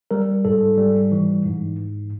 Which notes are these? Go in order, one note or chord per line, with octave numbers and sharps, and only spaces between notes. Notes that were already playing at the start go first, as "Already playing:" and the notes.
G3 A#4
G#2 A4
G3
E3
G#2